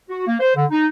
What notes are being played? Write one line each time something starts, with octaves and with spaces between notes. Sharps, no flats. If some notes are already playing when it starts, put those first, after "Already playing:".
F#4
A#3
C5
D3
D#4